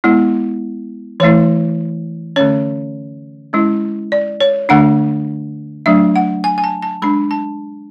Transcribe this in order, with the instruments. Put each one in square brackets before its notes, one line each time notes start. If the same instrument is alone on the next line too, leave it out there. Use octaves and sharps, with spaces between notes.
[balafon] G#3 B3 E4
E3 A3 E4 C#5
D3 A3 C#4 C#5
G#3 C#4 E4
D5
C#5
D3 A3 D4 F#5
F#3 A3 D4 E5
F#5
G#5
G#5
A5
A5
G#3 D4 B5
A5